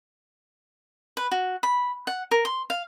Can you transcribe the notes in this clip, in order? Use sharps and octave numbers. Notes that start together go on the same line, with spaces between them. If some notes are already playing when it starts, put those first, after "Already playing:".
B4
F#4
B5
F#5
A#4
C6
F5